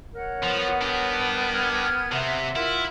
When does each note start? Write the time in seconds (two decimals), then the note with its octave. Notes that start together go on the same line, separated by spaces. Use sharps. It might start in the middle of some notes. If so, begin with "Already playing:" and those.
0.14 A#4 C#5 F#5
0.43 F3 B3
0.81 D4 G4
1.52 F6 G#6
2.12 C3 E5 F#5
2.56 E4 F4 A#4